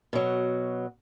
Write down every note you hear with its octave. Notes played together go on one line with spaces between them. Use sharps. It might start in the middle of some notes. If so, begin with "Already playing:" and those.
B2 F#3